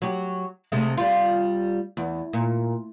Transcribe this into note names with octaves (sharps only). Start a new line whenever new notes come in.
F#3 G4
C3 G#3 A3
G3 F4
E2
A#2